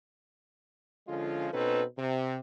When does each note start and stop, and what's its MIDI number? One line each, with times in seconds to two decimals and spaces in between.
1.08 1.49 50
1.08 1.49 53
1.08 1.49 56
1.08 1.49 61
1.08 1.49 65
1.53 1.83 47
1.53 1.83 60
1.53 1.83 61
1.53 1.83 63
1.53 1.83 69
1.53 1.83 71
1.98 2.38 48